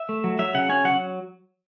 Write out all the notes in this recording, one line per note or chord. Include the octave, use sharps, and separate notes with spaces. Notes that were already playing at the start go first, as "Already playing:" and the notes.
Already playing: E5
A3
F#3
F#3 E5
C#3 F#5
C#4 G#5
F#3 F#5